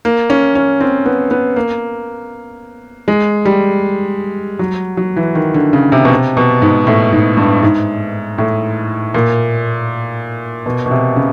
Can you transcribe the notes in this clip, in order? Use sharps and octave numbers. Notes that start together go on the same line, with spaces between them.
A#3
C#4
C#4
C4
B3
B3
A#3
G#3
G3
F#3
F#3
E3
D#3
D3
C#3
C3
B2
C3
B2
G#2
A2
G#2
G2
G#2
A2
A#2
B2
B2
C3
C#3